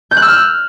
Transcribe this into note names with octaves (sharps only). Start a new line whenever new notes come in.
G6
F#6
E6
F6